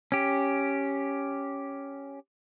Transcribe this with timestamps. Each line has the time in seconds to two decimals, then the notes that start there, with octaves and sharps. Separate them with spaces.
0.12 C#4 G4